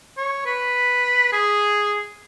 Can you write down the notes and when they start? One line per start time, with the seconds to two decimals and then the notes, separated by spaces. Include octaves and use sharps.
0.17 C#5
0.46 B4
1.32 G#4